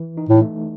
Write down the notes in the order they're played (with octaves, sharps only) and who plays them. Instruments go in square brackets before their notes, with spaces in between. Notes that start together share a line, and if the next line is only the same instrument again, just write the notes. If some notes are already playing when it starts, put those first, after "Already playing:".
Already playing: [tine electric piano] E3
D#4
[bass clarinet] A2
[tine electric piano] A3